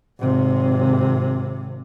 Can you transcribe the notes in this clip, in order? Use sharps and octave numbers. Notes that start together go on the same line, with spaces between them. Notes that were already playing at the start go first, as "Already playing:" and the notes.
G#1 C3